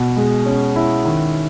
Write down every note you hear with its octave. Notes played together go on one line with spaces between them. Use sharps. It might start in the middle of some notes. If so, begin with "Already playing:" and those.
Already playing: B2
G#3
C#4
E4
D#3